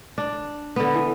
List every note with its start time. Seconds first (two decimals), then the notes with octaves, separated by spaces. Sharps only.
0.18 D4
0.76 D3 B3
0.94 E3